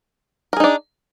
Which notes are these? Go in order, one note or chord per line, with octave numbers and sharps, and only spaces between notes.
D4 D#4 G#4 A#4